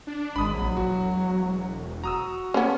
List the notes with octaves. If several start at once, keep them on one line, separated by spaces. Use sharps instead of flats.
D4
G#1 G#3 B5 D#6
A#1 F#3
E1 F#4
F#4 A#5 D#6 E6
A#3 B3 C#4